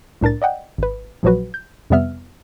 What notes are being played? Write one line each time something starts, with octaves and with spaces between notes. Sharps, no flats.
C2 A2 D4 A#4 A6
D5 D#5 F#5 G5
G#1 B4
A#1 A#2 F3 F#3 F#4 B4
G6
F2 C3 G3 B3 E5 F6